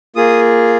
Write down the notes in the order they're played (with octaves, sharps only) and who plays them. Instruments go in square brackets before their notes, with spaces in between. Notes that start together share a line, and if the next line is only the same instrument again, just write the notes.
[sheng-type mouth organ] A#3 F4 G#4 D#6